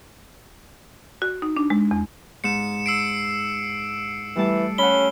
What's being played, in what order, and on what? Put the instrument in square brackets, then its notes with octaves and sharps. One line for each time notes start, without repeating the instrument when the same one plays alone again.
[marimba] F#4
D#4
D4
G#3
E2
[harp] G#2 [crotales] C#7 E7
[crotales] E6 C7 D7
[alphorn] E3 [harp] G3 A3 A5
[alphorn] C#4 [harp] F#5 B5 [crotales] G7